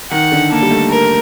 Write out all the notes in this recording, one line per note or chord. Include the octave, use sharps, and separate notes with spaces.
D#3 F#5
D3
A#3 A4
G3
A3
A#4